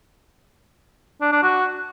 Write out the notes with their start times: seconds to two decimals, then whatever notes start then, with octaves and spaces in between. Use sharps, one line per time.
1.21 D4
1.32 D4
1.43 F#4